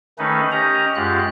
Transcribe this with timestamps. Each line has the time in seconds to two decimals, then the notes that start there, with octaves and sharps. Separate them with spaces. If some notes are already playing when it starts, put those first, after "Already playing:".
0.19 D#3 A3 C#4 D#4 B4
0.52 C#4 G4 D#5 A#5
0.96 F#2 G#3 F4 G4 F#6